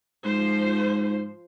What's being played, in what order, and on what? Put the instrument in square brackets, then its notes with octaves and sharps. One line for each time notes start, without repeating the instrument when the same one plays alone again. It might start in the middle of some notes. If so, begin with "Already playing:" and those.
[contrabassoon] G#2 [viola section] F3 C5